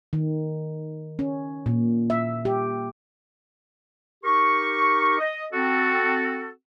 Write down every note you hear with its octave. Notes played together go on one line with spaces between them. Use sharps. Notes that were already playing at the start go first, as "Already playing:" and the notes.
D#3
C#4
A#2
E5
G4
D#4 G4 A#4 C#6
D#5
C4 F#4 A4